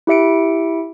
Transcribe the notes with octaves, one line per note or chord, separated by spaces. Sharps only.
E4 G4 E5 C#7 D7